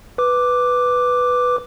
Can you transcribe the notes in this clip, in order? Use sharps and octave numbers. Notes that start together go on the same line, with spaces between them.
B4 D6